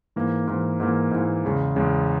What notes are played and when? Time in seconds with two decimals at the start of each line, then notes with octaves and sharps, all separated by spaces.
0.16 G#2 E3 A#3
0.47 G#2 E3 A#3
0.80 G#2 E3 A#3
1.11 G#2 E3 A#3
1.44 E2 C#3 G#3
1.76 E2 C#3 G#3